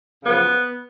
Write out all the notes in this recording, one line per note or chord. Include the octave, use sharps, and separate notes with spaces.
F#2 C#3 F3 B3